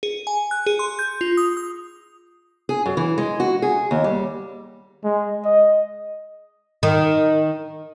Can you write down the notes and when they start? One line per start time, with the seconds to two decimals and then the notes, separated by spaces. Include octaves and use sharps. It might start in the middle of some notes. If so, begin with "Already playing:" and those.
0.03 G#4
0.27 G#5
0.51 F#6
0.66 G#4
0.79 C6
0.99 G6
1.21 F4
1.37 D#6
1.57 D#6
2.69 G#4
2.86 F#2
2.97 E3
3.18 G#3
3.40 F#4
3.62 G#4
3.91 D#2
4.04 G3
5.04 G#3
5.45 D#5
6.83 D#3